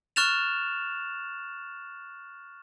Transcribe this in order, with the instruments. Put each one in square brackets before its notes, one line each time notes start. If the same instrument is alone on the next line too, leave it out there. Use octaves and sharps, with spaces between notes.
[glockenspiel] C#6 F6 F#6 A6 E7 F7